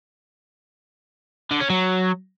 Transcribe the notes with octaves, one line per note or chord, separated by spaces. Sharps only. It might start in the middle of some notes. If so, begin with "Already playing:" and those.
D3
C#4
F#3